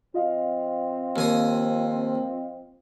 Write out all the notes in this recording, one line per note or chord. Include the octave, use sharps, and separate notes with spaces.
F3 C4 F4 D#5 F5
D#2 G#5 D#6